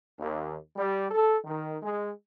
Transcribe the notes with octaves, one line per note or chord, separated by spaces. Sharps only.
D#2
G3
A4
D#3
G#3